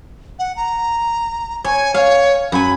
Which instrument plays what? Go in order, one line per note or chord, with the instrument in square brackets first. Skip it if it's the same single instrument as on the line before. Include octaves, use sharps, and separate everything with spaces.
[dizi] F#5
A#5
[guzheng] C#5 [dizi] G#5
[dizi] C#5 [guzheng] F5
[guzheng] F#2 G#5 [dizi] B5